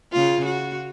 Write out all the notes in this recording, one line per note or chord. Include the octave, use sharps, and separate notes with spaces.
C#3 F4
F#4